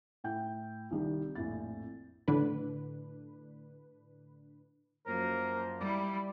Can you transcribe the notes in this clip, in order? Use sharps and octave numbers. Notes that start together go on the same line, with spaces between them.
A2 G5 G6
C2 D#3 G3
A#1 F2 A2 A6
A2 D3 D4 B4
F#2 F3 A#3 A#4 C5
G3 E4 D5